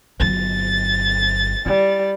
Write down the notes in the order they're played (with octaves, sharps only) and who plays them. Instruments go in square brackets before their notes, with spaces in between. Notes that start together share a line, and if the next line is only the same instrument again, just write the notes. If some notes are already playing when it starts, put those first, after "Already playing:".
[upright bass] G1 F#3 [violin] A6
[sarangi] G3 [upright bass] E4